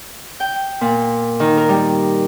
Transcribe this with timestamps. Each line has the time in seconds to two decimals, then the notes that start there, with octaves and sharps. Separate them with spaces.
0.40 G5
0.81 A#2
1.40 D#3
1.57 A#4
1.69 G3